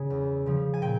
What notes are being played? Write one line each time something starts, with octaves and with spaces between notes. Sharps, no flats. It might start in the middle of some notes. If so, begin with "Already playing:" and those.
Already playing: C#3 G#5
E2
C#3 F3
G#5
A#2 G5